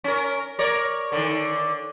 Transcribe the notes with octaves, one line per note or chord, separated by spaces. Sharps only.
C#4 A#4
A#4 C#5 D5
D3 D#3